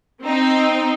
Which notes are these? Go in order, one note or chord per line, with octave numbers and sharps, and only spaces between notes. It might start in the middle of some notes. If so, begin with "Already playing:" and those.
C4 D#4